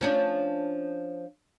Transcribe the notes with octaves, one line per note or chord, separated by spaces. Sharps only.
F3 C#4 D4